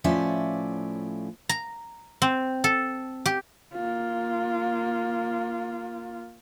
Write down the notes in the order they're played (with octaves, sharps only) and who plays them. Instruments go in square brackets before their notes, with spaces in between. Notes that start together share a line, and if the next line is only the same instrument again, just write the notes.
[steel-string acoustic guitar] A2 F3 C#4 D5 E5
[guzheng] A#5
C4
A4
G4
[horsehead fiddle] A#3 F4